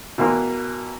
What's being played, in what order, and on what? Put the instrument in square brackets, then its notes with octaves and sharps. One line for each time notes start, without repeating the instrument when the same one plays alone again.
[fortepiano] B2 E3 A#3 C6